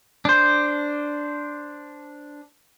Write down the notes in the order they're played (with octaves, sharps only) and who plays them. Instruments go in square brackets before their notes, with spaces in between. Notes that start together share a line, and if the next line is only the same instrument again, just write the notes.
[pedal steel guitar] D4 C5